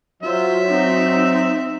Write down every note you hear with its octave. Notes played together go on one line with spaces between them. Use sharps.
F#3 F4 C5 E5
C4 D#4